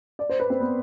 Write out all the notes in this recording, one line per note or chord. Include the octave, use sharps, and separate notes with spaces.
D5
C5
B4
C4
B3